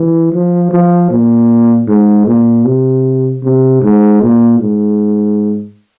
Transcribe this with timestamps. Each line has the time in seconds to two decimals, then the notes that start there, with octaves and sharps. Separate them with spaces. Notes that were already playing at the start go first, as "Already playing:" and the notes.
Already playing: E3
0.33 F3
0.71 F3
1.11 A#2
1.88 G#2
2.27 A#2
2.65 C3
3.43 C3
3.82 G#2
4.21 A#2
4.60 G#2